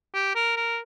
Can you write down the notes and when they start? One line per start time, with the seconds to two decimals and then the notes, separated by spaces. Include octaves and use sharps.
0.14 G4
0.35 A#4
0.57 A#4